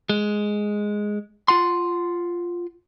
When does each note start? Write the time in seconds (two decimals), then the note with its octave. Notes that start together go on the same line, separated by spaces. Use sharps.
0.09 G#3
1.48 F4 F#5 C6